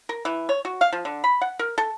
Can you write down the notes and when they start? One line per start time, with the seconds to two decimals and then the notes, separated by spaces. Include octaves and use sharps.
0.09 A#4
0.25 E3
0.49 C#5
0.65 F#4
0.81 F5
0.93 F3
1.05 D3
1.24 B5
1.41 F#5
1.59 A#4
1.78 A4